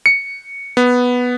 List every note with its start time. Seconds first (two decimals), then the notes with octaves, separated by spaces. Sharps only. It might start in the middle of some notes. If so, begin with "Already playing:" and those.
0.06 C#7
0.77 B3